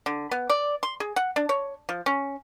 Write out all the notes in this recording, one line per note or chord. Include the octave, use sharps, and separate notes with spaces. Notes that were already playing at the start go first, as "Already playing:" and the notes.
D3
B3
D5
C6
G#4
F#5
D4
C#5
F3
C#4